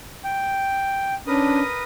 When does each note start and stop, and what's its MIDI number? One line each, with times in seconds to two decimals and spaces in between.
0.24 1.14 79
1.27 1.61 61
1.27 1.61 62
1.27 1.83 70
1.27 1.83 71
1.27 1.83 87